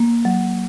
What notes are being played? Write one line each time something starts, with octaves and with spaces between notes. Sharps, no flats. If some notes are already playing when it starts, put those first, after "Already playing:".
Already playing: A#3
F#3